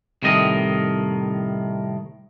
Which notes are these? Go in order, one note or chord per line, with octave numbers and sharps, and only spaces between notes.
C2 A2 D#3 D#5